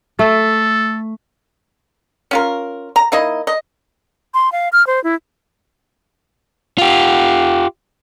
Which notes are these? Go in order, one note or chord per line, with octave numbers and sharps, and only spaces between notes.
A3 A4
C#4 F4 A#4
A#5
A#3 D#4 E4 D#5
D#5
C6
F5
F6
C5
E4
F4 G4